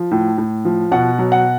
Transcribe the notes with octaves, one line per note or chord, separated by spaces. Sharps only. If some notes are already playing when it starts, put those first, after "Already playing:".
Already playing: F3
A2
A2
F3
B2 F#5
F#3
F#5